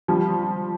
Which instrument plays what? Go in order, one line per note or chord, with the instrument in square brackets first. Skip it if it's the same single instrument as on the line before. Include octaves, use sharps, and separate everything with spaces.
[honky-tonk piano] F3 G3